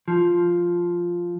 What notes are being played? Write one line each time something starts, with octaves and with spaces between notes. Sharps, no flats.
F3